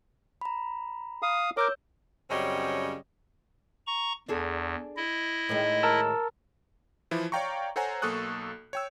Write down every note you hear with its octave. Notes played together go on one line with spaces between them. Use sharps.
A#5 B5
F5 D#6
A#4 C#5 D6 E6 G6
F#2 C#3 G3 C4 C#5 D#5
A#5 C#6
E2 D4 G#4 A4
E4 D#5
A2 D#3 G#3
A#4 A5 E6
E3 F3 E4
C#5 D5 F5 G5 A#5 C#6
A4 C5 C#5 F#5 G#5 A#5
B1 A#3 A4 C#6 D#6 F#6
C#5 G5 E6